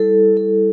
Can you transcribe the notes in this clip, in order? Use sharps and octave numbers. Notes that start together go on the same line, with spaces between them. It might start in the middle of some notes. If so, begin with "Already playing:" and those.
Already playing: G3 E4 A4
A4